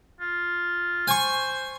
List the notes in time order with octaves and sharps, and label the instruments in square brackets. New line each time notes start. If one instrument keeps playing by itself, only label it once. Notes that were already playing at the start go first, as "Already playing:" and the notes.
[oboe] F4
[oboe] C5 [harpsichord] G#5 C#6